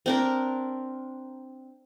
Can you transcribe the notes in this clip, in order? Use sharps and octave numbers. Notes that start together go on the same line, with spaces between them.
C4 D4 A#4